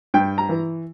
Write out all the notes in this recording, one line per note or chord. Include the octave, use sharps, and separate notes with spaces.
G2 G5
A#5
E3